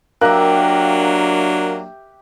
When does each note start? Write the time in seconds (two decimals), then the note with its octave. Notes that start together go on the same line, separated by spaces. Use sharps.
0.21 F#3 A#3 D4 G4 A#4 E5 F5 F#6